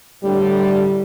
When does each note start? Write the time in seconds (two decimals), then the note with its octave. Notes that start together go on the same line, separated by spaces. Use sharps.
0.23 A2 D3 G3